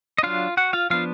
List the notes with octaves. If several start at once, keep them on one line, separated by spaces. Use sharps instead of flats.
D#5
F#3 D4 F4 F5
F#4 F#5
F4 F5
F3 B3 D4 F4 F5